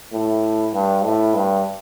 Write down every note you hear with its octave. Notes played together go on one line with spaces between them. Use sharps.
A2
G2
A2
G2